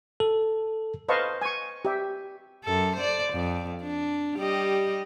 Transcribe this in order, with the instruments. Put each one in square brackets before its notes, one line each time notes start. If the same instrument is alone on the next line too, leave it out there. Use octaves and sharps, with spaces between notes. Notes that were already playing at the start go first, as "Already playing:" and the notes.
[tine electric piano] A4
[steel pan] B4 C5 D#5 F5 A5 C#6
G#5 C#6
G4 E5
[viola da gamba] F#2 A4
C5 D5
F2
D4
G3 G4 D#5